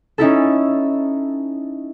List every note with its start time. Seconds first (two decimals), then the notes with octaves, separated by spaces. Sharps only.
0.18 C#4 D#4 E4 A4